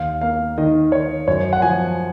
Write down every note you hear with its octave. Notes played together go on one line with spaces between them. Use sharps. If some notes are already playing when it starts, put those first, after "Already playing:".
Already playing: D#2 F5
A#3 F5
D#3 D#5
D#3 C#5
F#2 C#5
F#5
F3 G#5